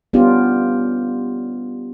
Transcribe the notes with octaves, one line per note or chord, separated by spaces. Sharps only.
G3 B3 C#4 D4 F4 G4